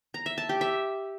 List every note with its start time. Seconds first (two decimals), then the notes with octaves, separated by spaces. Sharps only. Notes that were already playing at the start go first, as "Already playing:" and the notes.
0.14 A#5
0.26 E5
0.38 A5
0.49 G4
0.61 E5